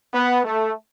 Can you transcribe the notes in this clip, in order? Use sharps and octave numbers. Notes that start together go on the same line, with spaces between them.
B3
A3